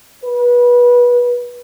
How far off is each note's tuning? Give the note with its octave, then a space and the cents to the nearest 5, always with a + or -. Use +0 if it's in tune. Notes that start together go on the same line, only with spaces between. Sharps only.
B4 -25